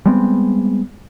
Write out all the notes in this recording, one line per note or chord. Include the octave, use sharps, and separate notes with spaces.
G3 G#3 B3 C4